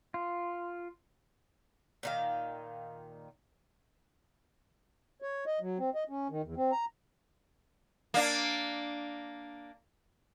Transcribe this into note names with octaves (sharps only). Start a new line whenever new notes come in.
F4
A#2 D#3 F5
C#5
D#5
F#3
C4
D#5
C#4
D#3
E2
C4
A#5
A#3 D4